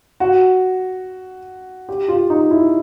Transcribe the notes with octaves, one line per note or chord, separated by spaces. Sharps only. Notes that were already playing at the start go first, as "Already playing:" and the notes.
F#4
G4
F4
D#4
E4